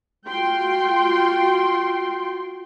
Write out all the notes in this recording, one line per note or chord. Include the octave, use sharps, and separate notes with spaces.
F4 F#4 G5 C6